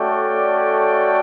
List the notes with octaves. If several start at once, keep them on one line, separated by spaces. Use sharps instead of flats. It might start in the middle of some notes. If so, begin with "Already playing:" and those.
Already playing: A3 C#4 F#4 A4 D5 G5
A3